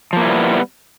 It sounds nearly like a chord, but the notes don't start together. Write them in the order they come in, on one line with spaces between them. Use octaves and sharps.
F3 A#3 E4 G3 B3